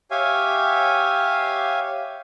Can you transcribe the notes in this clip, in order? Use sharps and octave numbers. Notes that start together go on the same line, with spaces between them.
G4 C#5 E5 F5 G#5